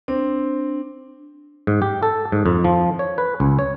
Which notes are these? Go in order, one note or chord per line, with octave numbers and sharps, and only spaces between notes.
C4 D4
G#2
G4
A4
G#2
F2
F3
C#5
B4
C#2
C#5